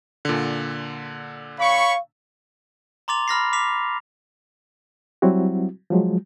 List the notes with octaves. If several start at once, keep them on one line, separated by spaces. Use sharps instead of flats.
A#2 D3
C#5 F5 B5 C#6
A#5 C6 D6 A6 F7
B5 F6 A#6 C7
D6 B6 C7 F7
F#3 G3 C4 E4 F#4
F3 F#3 G#3